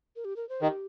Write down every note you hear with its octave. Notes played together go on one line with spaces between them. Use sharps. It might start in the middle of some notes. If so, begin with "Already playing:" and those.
A#4
G4
A#4
C5
D#3 G4